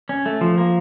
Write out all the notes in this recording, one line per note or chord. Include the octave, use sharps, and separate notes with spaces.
C#4
A3
F3
A#3